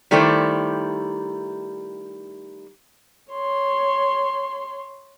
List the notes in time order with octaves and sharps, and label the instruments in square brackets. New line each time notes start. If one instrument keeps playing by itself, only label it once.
[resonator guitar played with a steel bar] D#3 G3 A3 E4 G4 C5
[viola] C#5 C6